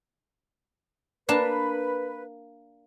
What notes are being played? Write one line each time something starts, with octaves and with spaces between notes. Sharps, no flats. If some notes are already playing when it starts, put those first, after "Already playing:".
A#3 D4 B4 A5